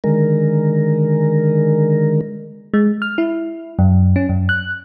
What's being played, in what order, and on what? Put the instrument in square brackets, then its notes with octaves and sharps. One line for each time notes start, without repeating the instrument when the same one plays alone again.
[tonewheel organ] D3 D#3 G#3 A#4
[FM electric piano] G#3
F6
E4
F#2
C#4
F#2
F#6